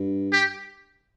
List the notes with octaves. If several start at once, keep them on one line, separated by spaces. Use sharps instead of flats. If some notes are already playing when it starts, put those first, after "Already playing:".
Already playing: G2
G4